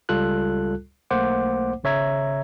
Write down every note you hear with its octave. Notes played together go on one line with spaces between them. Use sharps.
C#2 G3 F4 A4 F#6
B1 A3 A#3 C5 F#5 D6
G#1 C#3 C#5 E5 A#5 G#6